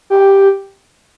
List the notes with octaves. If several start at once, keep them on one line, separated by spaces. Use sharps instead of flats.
G4